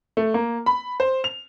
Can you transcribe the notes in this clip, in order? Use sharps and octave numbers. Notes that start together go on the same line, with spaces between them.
A3
A#3
B5
C5
F7